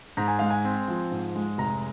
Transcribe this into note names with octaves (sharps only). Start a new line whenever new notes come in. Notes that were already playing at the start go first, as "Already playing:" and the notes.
G#2 A#5
G#5
G#3 F5
G#5
C4
F3
G#2
G#3
F1 A#5